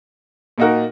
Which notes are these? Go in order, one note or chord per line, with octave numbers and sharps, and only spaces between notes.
A#2 A#3 D#4 F#4 A#4